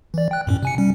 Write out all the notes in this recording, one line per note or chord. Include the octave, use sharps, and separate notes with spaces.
E3 D5
G5 F#6
F#2 A2 C#4
C3 G#5 C#7
G3 C#4